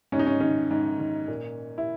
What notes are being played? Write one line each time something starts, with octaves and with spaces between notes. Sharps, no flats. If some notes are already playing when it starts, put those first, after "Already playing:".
G#2 C#4
D#4
C#4
D#3 C#4
G#2
D#3
A#2
E4